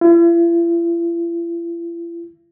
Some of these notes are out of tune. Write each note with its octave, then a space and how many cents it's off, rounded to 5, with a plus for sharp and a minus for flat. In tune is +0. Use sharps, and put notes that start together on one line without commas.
E4 +45